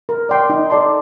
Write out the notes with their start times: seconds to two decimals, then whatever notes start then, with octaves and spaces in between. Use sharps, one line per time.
0.09 A#4
0.29 D5 G5 C6
0.50 D#4
0.70 A4 D5 A5 C6